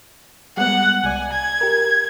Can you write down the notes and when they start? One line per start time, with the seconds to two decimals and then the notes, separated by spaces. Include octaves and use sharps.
0.57 G3 G#3 B3 F#5
1.04 C2 D5 G#5
1.32 G#6
1.61 G4 A#4